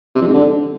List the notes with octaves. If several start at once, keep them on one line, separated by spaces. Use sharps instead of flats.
C3
F2
G#2
D3